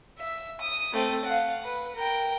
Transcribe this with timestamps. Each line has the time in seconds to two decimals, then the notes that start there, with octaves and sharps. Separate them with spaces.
0.19 E5
0.61 D#6
0.93 A3 C4
1.25 F5 F#5
1.64 B4
1.95 A#4 G5